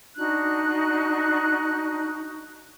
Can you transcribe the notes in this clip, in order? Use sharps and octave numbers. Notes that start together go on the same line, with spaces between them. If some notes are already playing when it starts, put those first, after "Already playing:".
D4 D#4 F#4 F#6